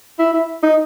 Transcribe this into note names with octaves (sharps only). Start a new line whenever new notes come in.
E4
E4
D#4